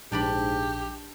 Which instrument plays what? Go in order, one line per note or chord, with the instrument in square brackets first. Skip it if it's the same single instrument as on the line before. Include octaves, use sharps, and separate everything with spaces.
[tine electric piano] A#1 [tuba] G#2 [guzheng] D4 D5 B5 [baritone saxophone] G4